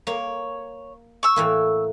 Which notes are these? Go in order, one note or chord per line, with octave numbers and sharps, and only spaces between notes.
A#3 C#5
C#6 E6
A2 E3 A#3